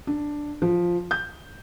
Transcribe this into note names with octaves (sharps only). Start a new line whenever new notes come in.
D4
F3
G6